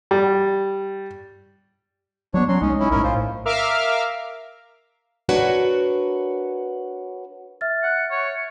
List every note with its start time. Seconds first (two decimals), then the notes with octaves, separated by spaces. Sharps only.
0.11 G3
2.34 F#3 B3 D4 C#5
2.48 F#3 C#4 C6
2.61 C2 G#3 C#4 D#4
2.80 C#4 E4
2.91 B1 A2 C#4 E4 A#4
3.03 F4 C5
3.45 A#4 E5 F5 D6 F6
5.29 D4 F#4 A#4 B4 C#5
7.61 E5 F6 A6
7.83 F#5
8.11 C#5